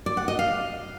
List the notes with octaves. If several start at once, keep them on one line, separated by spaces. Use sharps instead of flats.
D5
F#5
D#5
F5